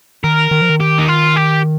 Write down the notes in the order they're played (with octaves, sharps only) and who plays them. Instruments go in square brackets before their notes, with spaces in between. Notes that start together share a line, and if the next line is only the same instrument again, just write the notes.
[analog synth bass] D#3 [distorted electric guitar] A#4
[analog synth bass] D#3
F3
D#3
[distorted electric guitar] G4
D#4
F4
G4